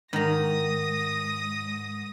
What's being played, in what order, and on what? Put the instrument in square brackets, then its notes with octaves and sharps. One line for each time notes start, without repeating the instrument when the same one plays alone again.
[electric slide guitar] G#2 [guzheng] D#3 A#5 [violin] D#6 A#6